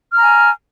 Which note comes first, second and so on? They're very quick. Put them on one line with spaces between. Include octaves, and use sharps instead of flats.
F6 A#5 G#5